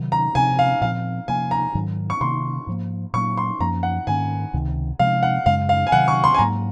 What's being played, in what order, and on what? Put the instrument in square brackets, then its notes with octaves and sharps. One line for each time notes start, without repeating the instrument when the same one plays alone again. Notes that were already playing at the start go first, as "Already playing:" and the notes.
Already playing: [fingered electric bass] C3 D#3 F#3
[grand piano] A#5
[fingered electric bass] C3 F3 C4 [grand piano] G#5
[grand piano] F5
[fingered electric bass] A#2 F3 C4 [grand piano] F5
[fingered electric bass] C3 F3 A#3 [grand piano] G#5
[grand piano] A#5
[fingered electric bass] G#2 D#3 F#3
[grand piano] C#6
[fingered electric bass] C3 D#3 A#3 [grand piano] C6
[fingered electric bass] G#2 F3 A#3
[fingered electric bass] A#2 F#3 A#3 [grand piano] C#6
[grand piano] C6
[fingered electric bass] F#2 F3 A#3 C#4 [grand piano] A#5
[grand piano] F#5
[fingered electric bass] G#2 D#3 A#3 C#4 [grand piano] G#5
[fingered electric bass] C#2 C3 D#3
[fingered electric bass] C3 F3 G#3 C4 [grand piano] F5
[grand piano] F#5
[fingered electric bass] F#2 C#3 G#3 [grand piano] F5
[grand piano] F5
G#5
[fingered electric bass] C3 D#3 F#3 [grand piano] F#5
[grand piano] C#6
C6
G#5
[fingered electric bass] G#2 F#3 A#3 [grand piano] A#5